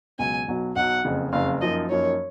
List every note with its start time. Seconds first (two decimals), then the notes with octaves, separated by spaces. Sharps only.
0.19 C#2 B2 F#3 G#5
0.48 B1 B2 F#3
0.76 B1 B2 F#3 F#5
1.05 F#1 F2 C#3
1.33 F#1 F2 C#3 F5
1.61 F#2 F3 A#3 D#4 D#5
1.90 F#2 F3 A#3 D#4 C#5